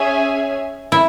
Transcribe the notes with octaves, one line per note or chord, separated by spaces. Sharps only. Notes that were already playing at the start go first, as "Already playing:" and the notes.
Already playing: C#4 G#4 C#5 E5 G#5
E4